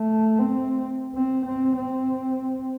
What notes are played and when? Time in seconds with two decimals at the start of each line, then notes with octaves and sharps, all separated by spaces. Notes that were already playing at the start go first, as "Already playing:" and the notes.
Already playing: A3
0.39 C4
1.15 C4
1.46 C4
1.77 C4